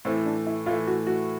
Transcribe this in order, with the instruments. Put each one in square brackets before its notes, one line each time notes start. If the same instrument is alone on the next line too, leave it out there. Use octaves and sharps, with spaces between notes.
[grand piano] A2 E3 A3 [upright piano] C4
[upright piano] D4
E4
[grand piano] A2 E3 A3 [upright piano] F4
[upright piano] F#4
F#4